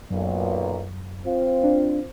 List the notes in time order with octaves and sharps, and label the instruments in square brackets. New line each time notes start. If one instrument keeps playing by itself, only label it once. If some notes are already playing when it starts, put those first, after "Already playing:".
[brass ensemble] B1 A#2 [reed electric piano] F#2
[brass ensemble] C4 F4 C5
[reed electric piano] D4